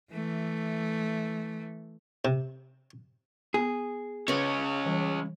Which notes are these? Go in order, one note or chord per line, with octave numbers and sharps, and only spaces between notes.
E3 A3
C3
B3 G#4
C#3 G#3 C#4 B4 C#5
E3 G3